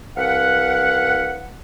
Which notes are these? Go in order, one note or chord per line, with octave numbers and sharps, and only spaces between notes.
C2 B4 F5 F#5